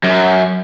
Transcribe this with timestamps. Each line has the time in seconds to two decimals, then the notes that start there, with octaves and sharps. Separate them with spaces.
0.04 F#2